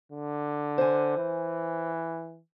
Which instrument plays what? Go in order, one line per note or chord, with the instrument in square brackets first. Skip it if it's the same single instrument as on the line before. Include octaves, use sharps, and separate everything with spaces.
[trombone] D3
[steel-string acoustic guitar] C5 G#5
[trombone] E3